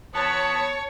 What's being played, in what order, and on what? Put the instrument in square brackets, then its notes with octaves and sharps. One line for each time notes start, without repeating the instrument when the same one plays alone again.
[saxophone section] E2 B3 [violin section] C#5 [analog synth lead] A5